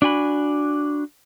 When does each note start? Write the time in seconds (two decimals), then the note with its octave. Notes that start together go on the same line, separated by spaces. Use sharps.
0.02 D4 F#4 G#5 B5